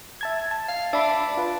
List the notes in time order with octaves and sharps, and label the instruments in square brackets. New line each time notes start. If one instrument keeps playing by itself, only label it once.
[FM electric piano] E5 A5 G#6
A5
[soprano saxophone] F5
[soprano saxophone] D4 [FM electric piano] E5 B5
[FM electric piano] F4 B4